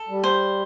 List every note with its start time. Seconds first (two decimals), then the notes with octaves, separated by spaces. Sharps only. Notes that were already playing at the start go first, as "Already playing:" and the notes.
Already playing: A4
0.09 G3
0.24 C5